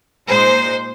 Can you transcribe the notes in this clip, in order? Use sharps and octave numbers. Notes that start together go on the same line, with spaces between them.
A#2 G#3 D#4 C5